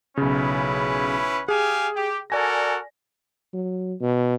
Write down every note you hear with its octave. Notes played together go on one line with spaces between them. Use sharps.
B1 C#3 C#4 E4 B4
G4 G#4 F5 G#5
G4
F#4 A4 A#4 D5 G#5 A#6
F#3
B2